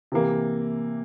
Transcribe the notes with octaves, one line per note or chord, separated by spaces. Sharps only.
C3 E3 A#3